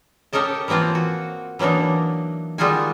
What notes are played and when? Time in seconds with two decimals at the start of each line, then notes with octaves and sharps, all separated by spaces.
0.33 G4 A4 A#4 C#5 D#5 A5
0.68 E3 F3 A#3 C4 F4
0.95 F#4
1.59 E3 F#3 A#3 D4 D#4
2.58 D#3 G3 G#3 F4 F#4 G#5